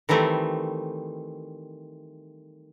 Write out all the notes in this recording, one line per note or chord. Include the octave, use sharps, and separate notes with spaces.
D#3 E3 G3 A3 C4